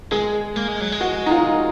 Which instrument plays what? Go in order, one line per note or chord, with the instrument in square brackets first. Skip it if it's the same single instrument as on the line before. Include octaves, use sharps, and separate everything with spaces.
[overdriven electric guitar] G#3 [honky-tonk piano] G#4
[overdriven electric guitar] A#3
G#3
F#3
G#3
[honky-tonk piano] F#4
D#4
F4